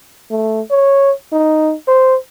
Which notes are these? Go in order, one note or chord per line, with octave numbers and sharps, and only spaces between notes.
A3
C#5
D#4
C5